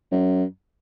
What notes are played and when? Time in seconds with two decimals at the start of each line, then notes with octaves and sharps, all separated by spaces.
0.12 F#2